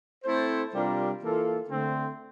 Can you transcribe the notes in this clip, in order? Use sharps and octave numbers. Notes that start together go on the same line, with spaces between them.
A3 C4 E4 A4 C5
C3 G3 D4 F4 A#4
E3 A#3 F4 A4
D3 A3 C4